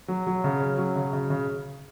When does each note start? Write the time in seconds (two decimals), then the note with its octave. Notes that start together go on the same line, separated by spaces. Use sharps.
0.08 F#3
0.27 F#3
0.44 C#3
0.61 C#4
0.78 F#3
0.96 C#3
1.13 C#3
1.30 C#3